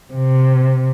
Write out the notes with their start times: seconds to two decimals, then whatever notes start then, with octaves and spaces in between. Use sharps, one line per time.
0.12 C3